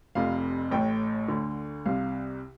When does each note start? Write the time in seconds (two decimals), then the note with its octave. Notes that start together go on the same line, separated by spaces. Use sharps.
0.15 F1 F2 C3 F5
0.71 A1 A2 G5
1.28 D2 D3
1.86 C2 C3 F5